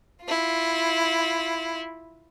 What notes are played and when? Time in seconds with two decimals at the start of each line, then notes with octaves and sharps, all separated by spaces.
0.24 E4 F4